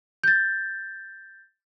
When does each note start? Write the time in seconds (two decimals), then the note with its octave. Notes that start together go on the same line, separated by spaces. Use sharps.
0.24 G6 A6